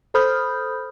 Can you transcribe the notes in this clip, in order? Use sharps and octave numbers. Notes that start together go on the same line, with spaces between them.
A4 C5 B5 D#6 F6 G6